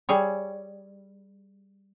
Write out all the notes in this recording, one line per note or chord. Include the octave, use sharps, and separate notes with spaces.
G3 G#4 C#5